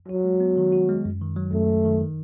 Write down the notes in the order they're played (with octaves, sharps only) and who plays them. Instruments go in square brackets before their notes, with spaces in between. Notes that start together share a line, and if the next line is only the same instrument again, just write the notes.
[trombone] F#3 [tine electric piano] F#4
[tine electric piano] G#3
B3
D#3
F#4
G#3
F#2
D#3
F#3
[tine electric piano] F#2 [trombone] A3
[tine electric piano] F#2
D#3
D#3